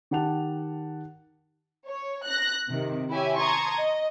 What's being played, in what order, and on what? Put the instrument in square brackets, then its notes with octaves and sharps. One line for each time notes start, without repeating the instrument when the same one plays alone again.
[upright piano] D#3 G4 F#5 A5 F7
[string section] C#5
F#6 A#6
C3 D#3
E4 G4 C#5 E5 G#5
A5 A#5 C6 C#6 D#6 G#6
D#5